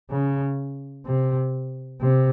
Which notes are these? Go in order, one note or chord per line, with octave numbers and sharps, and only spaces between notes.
C#3
C3
C3